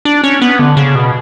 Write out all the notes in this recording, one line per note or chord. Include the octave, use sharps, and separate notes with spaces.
D4
C#4
B3
D3
C#3
B2